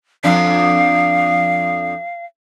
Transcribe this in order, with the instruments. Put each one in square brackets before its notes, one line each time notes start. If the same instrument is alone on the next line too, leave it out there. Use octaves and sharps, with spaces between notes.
[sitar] F2 D4 [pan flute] F5